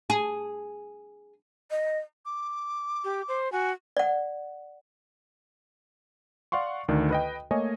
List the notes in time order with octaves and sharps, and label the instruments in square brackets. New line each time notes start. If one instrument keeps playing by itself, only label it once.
[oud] G#4
[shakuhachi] D#5
[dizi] D6
[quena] G4
C5
[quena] F#4 [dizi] G#5
[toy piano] D5 F#5
[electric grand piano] D5 F5 F#5 C6 C#6
D2 D#3 D4
B4 D#5 G5
A3 A#3 C#5 D#5 G#5